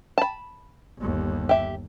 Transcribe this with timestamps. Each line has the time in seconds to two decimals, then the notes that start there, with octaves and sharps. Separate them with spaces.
0.18 A5 B5
0.98 G1 D#2
1.49 G4 E5